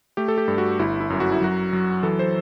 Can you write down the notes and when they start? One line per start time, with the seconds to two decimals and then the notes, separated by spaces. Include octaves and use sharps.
0.17 A3 G4
0.28 A4
0.38 G4
0.48 G2
0.58 F#4
0.79 G1 E4
1.01 E4
1.10 F#2
1.20 F#4
1.32 E4
1.41 F#3 F#4
1.73 F#3
2.03 E3 A4
2.19 C5